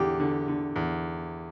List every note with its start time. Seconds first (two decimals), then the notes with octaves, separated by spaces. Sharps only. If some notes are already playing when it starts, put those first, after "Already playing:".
Already playing: E2 D3 G4
0.20 D3
0.48 D3
0.76 E2